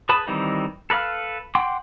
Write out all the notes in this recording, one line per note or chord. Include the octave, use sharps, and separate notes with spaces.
G#4 B4 A5 B5 D#6
D#3 E3 G3 C4 D#4
A4 B4 D5 F5 F6
F#5 G5 C6 D6